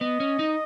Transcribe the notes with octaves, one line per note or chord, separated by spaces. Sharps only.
B3 D#5
C#4
D#4